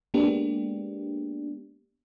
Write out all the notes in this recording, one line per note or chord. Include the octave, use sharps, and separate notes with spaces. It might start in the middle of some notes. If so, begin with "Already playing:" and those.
G#3 A#3 B3 D4 G4